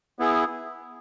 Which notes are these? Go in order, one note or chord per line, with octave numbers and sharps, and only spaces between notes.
B3 E4 G#4